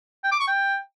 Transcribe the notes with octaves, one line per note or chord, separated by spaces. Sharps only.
G5
D6
C#6
G5